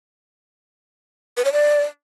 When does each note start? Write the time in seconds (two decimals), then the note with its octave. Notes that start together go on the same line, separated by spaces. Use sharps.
1.37 B4
1.45 C#5
1.53 D5